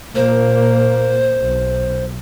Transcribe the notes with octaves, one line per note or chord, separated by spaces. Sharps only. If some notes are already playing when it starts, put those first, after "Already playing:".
A#2 A#3 C5
B1